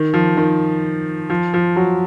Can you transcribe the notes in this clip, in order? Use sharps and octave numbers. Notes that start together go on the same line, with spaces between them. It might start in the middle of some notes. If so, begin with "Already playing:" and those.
Already playing: D#3
F3
D#3
F3
F3
F#3